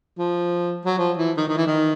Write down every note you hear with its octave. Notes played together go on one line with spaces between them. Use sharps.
F3
F#3
F3
E3
D#3
D#3
E3
D#3